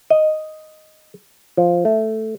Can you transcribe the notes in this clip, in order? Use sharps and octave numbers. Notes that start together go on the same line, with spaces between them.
D#5
F3
A3